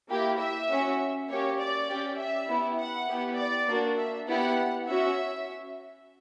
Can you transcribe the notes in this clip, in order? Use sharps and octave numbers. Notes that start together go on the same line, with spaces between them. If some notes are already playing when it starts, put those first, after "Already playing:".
A#3 E4 G4
E5
C#4 F#4
A#3 C#4 G4 C#5
D5
C#4 G4
E5
B3 E4 G4
F#5
B3 E4 G4
D5
A#3 D4 F#4
E5
B3 E4 G4 F#5
C#4 F#4 E5